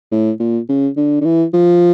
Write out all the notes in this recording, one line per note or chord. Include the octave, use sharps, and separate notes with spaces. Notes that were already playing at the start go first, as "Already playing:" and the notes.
A2
A#2
C#3
D3
D3
E3
F3